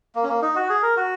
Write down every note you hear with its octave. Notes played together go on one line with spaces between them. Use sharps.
A#3
C#4
A#3
D#4
F#4
G#4
A#4
F#4